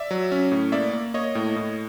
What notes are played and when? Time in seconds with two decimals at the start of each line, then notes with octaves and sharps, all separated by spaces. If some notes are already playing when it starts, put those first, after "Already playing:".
Already playing: D5 E5
0.11 F#3
0.32 C#4
0.52 A2
0.72 A#3 D5 E5
0.93 A#3
1.14 A#3 C#5 D#5
1.35 A2
1.56 A2